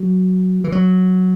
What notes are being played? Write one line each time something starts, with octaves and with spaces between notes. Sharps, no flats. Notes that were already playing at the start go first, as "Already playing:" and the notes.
Already playing: F#3
E3
F#3